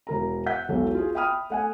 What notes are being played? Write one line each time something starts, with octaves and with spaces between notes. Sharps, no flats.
E1 A#4 A#5
E5 F#5 G6 B6
E1 B1 E2 A4
F4 F#4 G#4
E5 G5 B5 D#6 F6
A3 F#5 G#5